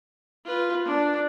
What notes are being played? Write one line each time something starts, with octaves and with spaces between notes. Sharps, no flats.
F4 B4
D4